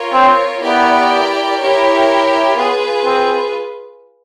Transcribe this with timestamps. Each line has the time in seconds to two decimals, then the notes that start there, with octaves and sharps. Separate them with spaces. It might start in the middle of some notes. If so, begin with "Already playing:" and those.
Already playing: F4 A#4 C#5
0.13 C4
0.61 B3 E4 G4 A#4 D5 G5
1.59 E4 G4 A#4 C#5
2.55 B3 F4 G#4 B4
3.04 C4